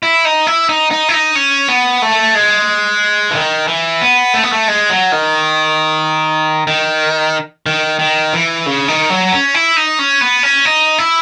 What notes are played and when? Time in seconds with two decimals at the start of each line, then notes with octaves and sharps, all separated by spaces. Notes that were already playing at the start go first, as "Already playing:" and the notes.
0.03 E4
0.25 D#4
0.47 E4
0.69 D#4
0.91 D#4
1.09 E4
1.14 D#4
1.35 C#4
1.68 B3
2.02 A3
2.35 G#3
3.31 E3
3.35 D#3
3.68 E3
4.02 B3
4.34 A3
4.43 B3
4.52 A3
4.68 G#3
4.90 F#3
5.12 D#3
6.67 D#3
7.66 D#3
7.99 D#3
8.33 E3
8.66 C#3
8.88 D#3
9.10 F#3
9.32 C#4
9.54 E4
9.76 D#4
9.99 C#4
10.21 B3
10.43 C#4
10.65 D#4
10.98 E4